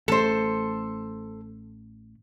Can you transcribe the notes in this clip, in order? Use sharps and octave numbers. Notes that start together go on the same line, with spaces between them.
A1 A3 A4 C5